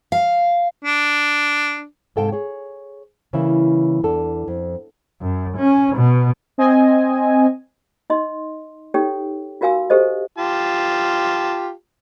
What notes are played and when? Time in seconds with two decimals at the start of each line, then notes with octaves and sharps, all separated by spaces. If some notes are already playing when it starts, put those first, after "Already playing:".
0.12 F5
0.85 D4
2.16 G#2 C3 A4 F5 G5 A5
2.32 G#4 C#5
3.33 C#3 E3 G3 A#3 E4
4.03 E2 D4 A4
4.48 F2
5.22 F#2
5.58 C#4
5.96 B2
6.58 C4 D#5 G#5
8.10 D#4 D#5 C6
8.94 D#4 G4 A4 C#5 G5
9.61 F4 F#4 A#4 F5 G#5 E6
9.90 G4 A4 C5 D#5
10.38 F4 G4 A5